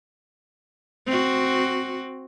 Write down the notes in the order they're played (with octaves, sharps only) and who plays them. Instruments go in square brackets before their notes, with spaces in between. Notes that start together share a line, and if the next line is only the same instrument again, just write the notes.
[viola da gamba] C4 F#4